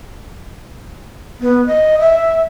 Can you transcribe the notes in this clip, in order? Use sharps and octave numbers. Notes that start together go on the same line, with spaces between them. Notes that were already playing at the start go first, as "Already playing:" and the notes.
B3
D#5
E5